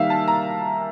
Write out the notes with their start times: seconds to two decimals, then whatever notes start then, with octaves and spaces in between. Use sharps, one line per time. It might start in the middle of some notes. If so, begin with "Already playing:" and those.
Already playing: D#3 G3 A#3 E5 F5
0.10 A5
0.28 A#5